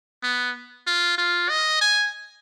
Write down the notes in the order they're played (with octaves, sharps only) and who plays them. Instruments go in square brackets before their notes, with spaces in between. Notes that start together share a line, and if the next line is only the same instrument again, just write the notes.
[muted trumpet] B3
F4
F4
D#5
G#5